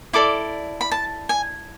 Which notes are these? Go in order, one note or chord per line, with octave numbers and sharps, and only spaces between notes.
E4 A4 D5 D6
B5
A5
G#5